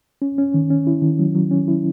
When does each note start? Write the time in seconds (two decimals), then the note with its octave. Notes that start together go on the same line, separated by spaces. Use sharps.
0.22 C#4
0.38 C#4
0.54 D#3
0.70 C#4
0.87 E4
1.02 D#3
1.19 F#3
1.35 F#3
1.51 C#4
1.68 E4